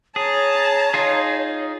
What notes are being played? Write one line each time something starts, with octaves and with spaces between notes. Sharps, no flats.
G#4 C#5 A5 A#5
D#4 F4 G#4